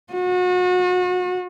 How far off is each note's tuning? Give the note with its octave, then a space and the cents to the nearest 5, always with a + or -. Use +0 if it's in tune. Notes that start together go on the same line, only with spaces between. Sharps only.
F#4 -35